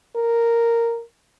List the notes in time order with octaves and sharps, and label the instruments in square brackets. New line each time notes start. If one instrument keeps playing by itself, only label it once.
[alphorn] A#4